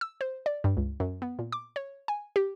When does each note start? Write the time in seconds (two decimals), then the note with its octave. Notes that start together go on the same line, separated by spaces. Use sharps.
0.01 E6
0.21 C5
0.46 D5
0.64 G2
0.77 C#2
1.00 F#2
1.22 B3
1.39 A#2
1.52 D6
1.76 C#5
2.08 G#5
2.36 G4